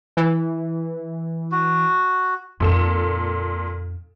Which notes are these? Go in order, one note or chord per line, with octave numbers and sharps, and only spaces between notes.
E3
F#4
F2 A#2 D#4 A4 E7